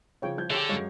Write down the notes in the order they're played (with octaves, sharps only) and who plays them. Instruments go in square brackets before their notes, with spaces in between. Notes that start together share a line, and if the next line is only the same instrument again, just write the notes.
[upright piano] C#3 F3 [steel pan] C#5 G5
[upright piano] F3 G6 G#6
[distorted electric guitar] D3 [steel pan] G4 C#5 E5 [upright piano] G#4
[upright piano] F#2 F#3 G#3 [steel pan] C#5 F5